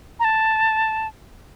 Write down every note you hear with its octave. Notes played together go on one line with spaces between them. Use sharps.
A#5
A5